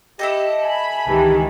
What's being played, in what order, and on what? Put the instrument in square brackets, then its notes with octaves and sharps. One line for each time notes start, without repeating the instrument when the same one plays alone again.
[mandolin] E4 A4 D#5 [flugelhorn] G4
[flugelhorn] G#5 [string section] B5
[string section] C#2 D#3 E3 [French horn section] G4